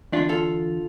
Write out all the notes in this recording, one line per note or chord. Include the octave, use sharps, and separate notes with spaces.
E2 D3 D4 F4
F4 A4